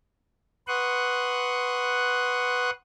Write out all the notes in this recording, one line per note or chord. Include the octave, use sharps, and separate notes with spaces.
B4 F#5 C6 C#6 D#6 F#6